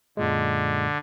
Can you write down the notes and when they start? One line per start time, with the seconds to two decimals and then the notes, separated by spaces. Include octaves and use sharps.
0.17 F#2 A#2 D3 G#3